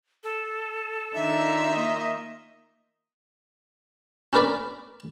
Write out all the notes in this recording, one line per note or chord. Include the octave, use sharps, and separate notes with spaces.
A4
D#3 D4 D#4 F4 E5
A#3 D#5
C#4 D4 A#4 B4 D5 B5